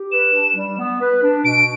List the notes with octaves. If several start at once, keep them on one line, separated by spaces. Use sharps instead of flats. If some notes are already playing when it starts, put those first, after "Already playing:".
Already playing: G4
B4 E7
D4
G3
B3
B4
D4
B2 D7